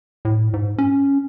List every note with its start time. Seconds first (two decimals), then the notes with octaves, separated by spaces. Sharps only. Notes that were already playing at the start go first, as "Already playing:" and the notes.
0.25 A2
0.53 G#2
0.78 C#4